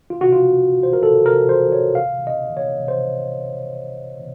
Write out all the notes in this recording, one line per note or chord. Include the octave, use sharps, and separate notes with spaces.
F4
F#4
F4
C5
A#4
A4
A#4
C5
C#5
F5
D#5
C#5
C5